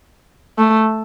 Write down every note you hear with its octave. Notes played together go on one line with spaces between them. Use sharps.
A3